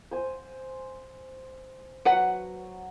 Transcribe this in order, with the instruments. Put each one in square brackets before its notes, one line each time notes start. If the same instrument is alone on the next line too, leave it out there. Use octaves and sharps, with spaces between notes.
[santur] C5 G#5
[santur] F#3 [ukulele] B4 F#5